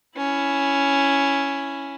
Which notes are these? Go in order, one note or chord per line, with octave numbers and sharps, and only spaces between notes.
C#4 E4